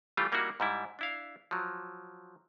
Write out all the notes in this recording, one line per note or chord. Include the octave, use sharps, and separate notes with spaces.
E3 G3 A3 F4 G4
G3 A#3 D#4 E4 F#4
G#2 G3 E4
D4 E4 F5
F3 F#3